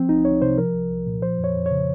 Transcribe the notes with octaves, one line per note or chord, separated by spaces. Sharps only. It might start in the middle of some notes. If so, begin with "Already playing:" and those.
Already playing: F3 C4
C2 D#4
C2 C#5
C3 C5
F3 A#4
C2
C2
A#2
F3 C5
F2
C#5
F2
C#5
C#3